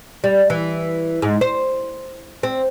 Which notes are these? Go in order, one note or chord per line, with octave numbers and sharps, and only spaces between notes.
G3
E3
G#2
C5
C4